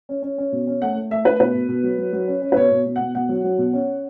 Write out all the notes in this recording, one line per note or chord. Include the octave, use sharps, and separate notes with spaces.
C#4
C#4
C#4
B2
C#4
A3 F#5
A3
A3 E5
A3 B4
B2 B4
B2
B2
F#3
F#3
F#3
C#4
C#4
B4
B2 C#5
B2
B2
F#5
B2
B2 F#5
F#3
F#3
B2
C#4